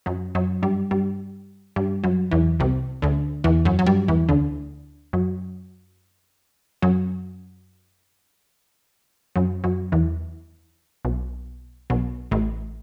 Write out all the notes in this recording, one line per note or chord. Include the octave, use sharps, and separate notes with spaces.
F#2 F#3
F#2 F#3
G2 G3
G2 G3
G2 G3
F#2 F#3
E2 E3
C2 C3
D2 D3
E2 E3
F#2 F#3
F#3
G2 G3
E2 E3
D2 D3
F#2 F#3
F#2 F#3
F#2 F#3
F#2 F#3
E2 E3
B1 B2
B1 B2
A1 A2